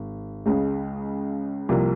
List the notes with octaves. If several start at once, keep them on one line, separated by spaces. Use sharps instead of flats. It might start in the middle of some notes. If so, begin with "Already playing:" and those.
Already playing: G#1
C#2 C#3 G#3
C2 C3 F3 A#3